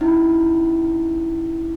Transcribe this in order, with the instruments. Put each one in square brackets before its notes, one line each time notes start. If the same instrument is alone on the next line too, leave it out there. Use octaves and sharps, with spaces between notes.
[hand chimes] C#4 D#4 E4